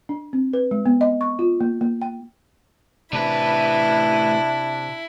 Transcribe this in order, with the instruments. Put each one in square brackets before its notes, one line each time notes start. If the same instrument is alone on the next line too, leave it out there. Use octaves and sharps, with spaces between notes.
[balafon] D4
C4
B4
G#3
B3
D#5
C#6
F4
A#3
A#3
G5
[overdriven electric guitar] A2 B4 [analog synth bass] C3 [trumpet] D4 [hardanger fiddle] E4